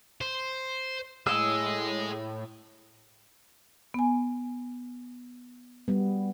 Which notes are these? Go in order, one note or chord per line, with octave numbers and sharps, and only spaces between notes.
C5
A2 G#4 D#5 E6
B3 G#5
G3 B3